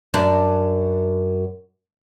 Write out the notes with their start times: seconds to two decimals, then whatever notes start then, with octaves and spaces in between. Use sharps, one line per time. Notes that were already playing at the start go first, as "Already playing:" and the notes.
0.14 F#2 D4